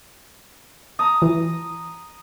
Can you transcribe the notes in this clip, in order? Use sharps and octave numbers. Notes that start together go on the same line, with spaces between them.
A5 A#5 D#6
E3